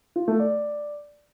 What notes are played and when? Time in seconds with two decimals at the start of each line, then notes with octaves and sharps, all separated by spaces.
0.16 F4
0.28 A3
0.40 D5